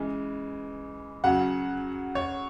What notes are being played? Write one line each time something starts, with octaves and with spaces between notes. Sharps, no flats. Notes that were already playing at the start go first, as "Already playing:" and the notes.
Already playing: C#3 E3 G#3
C#3 F#3 F#5
C#5